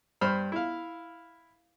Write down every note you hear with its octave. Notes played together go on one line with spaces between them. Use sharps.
G2 C5 B5 F6
E4 F5